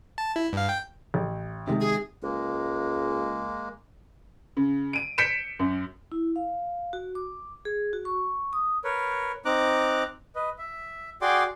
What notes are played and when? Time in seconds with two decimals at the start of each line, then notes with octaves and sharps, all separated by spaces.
0.18 A5
0.36 E4
0.53 G2 F5
0.69 G5
1.14 A1
1.67 C3 D#3 G#3
1.80 G#4
2.23 C#2 G#3 A#3
4.57 C#3
4.93 D7 D#7
5.18 G6 B6 C#7 D7 E7
5.59 F#2
6.12 E4
6.36 F5
6.93 F#4
7.15 D6
7.65 G#4
7.93 F#4
8.05 C#6
8.53 D#6
8.84 A#4 B4 C#5
9.45 C4 D#4 A#5 D6 F#6
10.35 B4 D#5
10.58 E5
11.22 F#4 G#4 D5 G5 C6 D6